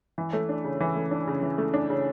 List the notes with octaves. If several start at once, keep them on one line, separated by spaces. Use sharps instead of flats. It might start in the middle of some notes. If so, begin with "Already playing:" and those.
E3
A3
D4
C#3
E3
A3
D4
C#3
E3
A3
D4
C#3